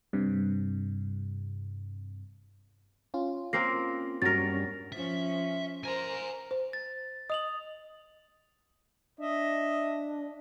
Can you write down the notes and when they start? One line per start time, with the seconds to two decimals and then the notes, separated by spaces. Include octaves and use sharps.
0.13 G2 C3
3.14 C#4 F4
3.53 A#3 C4 A#4 A#6 C7
4.22 G2 F#3 C#4 A#4 A6 A#6
4.92 F3 C#4 E5
5.84 A#4 C5 G#5 A#5
6.51 C5
6.73 A6
7.30 D#5 D#6 F7 F#7
9.20 D4 D#5 E5